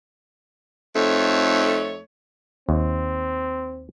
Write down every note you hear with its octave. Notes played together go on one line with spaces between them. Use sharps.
F2 A3 D#4 C#5
D#2 C4